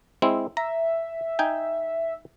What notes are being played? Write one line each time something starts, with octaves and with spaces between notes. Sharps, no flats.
G#3 C4 E4
E5 A#5
D#4 G5 G#5